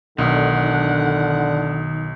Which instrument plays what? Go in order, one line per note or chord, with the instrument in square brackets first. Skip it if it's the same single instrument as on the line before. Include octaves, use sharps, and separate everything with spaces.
[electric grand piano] B1 [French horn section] D3 [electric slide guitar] D#3 [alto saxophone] F#5